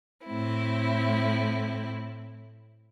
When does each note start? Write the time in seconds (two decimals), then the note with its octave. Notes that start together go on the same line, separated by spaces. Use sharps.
0.24 A2 C4 E4